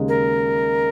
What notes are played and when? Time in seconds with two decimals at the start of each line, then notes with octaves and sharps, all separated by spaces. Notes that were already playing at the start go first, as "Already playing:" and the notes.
Already playing: D#2 C#3 G#3 D#4
0.09 A#4